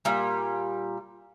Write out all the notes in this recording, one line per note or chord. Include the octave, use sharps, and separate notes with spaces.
A#2 G3